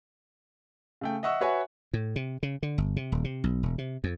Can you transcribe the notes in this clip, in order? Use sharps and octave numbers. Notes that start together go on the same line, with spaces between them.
C#3 A3 G5
D#5 E5 F#5 C#6 E6
F#4 B4 C#5 E5 F#5 G#5
A2
C3
C#3
D3
G1
C3
D#1
C3
B1
E1
C3
F2